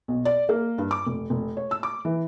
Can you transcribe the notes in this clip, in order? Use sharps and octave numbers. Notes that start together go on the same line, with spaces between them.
B1
D5
A#3
G2
D6
F1
F1
C#5
E6
D6
E3